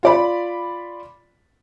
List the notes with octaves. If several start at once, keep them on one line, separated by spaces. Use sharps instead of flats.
F4 D5 B5